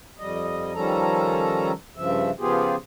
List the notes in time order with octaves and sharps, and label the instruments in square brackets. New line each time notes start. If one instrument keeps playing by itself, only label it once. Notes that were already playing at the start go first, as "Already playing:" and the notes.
[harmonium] F2 G3 D#5
D#3 F3 G3 C#4 A4 A#5
G2 C#3 F3 E5
C#3 F3 B3 F4 G4 G#4